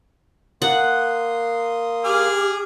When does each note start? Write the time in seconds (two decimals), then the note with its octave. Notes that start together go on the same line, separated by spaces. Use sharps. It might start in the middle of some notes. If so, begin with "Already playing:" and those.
0.62 A#3 F#5 C6 D#6
2.04 G4 G#4 D6 F6